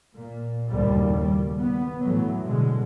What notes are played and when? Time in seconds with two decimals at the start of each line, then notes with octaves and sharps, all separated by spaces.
0.14 A#2
0.68 F#1 D#2 A2 G3
1.18 G3
1.57 B3
2.01 A2 E3 F#3
2.42 B2 D3 G#3